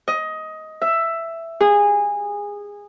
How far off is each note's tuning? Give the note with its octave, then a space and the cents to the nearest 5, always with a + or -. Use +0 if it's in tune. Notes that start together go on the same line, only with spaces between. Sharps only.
D#5 +15
E5 +10
G#4 -20